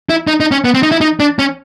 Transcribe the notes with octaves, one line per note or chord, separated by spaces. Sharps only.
E4
D#4
D#4
C#4
B3
C4
D#4
E4
D#4
D4
C#4